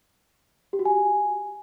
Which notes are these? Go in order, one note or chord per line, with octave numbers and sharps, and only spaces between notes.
G4
F#4
G#5